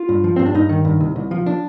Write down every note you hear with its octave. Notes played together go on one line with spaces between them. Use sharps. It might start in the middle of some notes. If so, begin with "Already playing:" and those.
Already playing: F4
G2
F3
G2 C4
D4
G2 D#4
D#3
G2
C2
C2
F3
D4